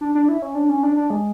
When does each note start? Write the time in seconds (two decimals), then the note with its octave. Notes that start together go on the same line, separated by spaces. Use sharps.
0.01 D4
0.15 D4
0.29 E4
0.42 C#4
0.55 D4
0.69 C#4
0.83 D4
0.97 D4
1.10 G#3